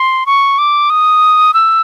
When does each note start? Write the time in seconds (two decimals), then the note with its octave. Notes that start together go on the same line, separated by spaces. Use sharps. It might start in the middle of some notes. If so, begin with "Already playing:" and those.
Already playing: C6
0.26 C#6
0.58 D6
0.90 D#6
1.54 E6